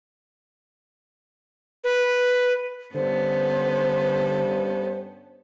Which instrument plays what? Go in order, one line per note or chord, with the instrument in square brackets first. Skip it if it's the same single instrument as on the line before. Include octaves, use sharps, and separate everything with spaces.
[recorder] B4
[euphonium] G2 [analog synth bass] D3 [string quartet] B3 C#4 A4 [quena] C5